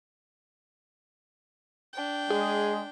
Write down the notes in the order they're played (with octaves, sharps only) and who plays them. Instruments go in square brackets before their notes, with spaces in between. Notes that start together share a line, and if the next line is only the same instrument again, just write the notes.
[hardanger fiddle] D4 G5
[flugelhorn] G#3 [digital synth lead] G#4